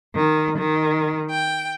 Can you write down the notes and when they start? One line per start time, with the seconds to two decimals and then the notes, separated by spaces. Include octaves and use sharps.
0.15 D#3
0.57 D#3
1.29 G5